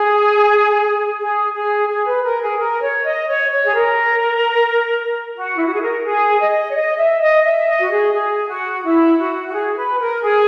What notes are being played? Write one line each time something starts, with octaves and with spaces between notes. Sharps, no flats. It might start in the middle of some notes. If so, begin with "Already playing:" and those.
Already playing: G#4
G#4
G#4
G#4
B4
A#4
G#4
A#4
C#5
D#5
C#5
C#5
G#4
A#4
F#4
E4
F#4
G#4
A#4
G#4
D#5
C#5
D#5
E5
D#5
E5
D#5
F#4
G#4
G#4
F#4
E4
F#4
F#4
G#4
B4
A#4
G#4